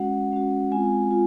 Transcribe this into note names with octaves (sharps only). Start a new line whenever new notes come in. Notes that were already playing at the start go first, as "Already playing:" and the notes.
Already playing: G#3 C#4 F#4 F#5
G#3 C#4 F#4
G#3 C4 F4 G#5
F4